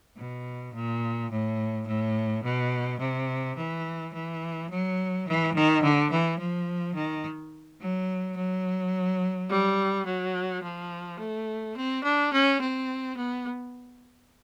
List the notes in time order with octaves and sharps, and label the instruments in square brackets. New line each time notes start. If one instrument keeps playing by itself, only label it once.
[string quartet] B2
A#2
A2
A2
B2
C3
E3
E3
F#3
E3
D#3
D3
E3
F3
D#3
F#3
F#3
G3
F#3
F3
A3
C4
D4
C#4
C4
B3